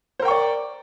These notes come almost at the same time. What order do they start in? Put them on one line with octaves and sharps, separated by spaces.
C5 A#4 G5 C#6 D5